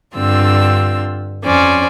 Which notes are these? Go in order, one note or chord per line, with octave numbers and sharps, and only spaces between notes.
G2 D3 C4 F4 E6
F2 C#4 C5 D5